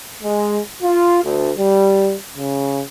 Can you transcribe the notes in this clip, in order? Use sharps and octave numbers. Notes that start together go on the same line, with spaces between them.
G#3
F4
D2
G3
C#3